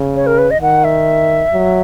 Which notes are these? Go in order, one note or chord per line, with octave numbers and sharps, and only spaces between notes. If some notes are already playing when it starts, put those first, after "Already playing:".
Already playing: C#3
C#5
A#4
B4
D#5
D#3 F#5
E5
F#3